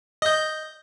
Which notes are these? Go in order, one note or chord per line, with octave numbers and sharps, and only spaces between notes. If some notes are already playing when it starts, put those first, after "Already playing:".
D#5 G6